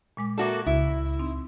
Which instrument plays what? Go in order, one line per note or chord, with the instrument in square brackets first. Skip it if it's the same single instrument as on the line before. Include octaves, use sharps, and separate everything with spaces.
[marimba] A#2 G#3 D6
[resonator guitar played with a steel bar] A#3 F#4 A4 [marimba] D5 E5 A5
[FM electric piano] C#2 [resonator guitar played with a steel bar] E4
[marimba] C4 D#4